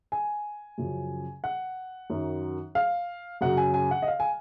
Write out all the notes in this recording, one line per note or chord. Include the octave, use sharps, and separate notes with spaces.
G#5
F#2 C#3 F3
F#5
F#2 D#3 F#3
F5
F#2 C#3 F#3 F#5
G#5
G#5
F#5
D#5
F5
G#5